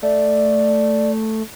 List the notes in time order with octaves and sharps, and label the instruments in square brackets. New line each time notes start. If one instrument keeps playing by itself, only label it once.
[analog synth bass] A3 [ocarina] D5